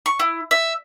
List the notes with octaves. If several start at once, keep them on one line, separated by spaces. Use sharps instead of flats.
C#6
E4
E5